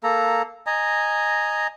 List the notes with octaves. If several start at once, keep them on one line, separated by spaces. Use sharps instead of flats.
A#3 A4 A#5
D#5 G#5 A#5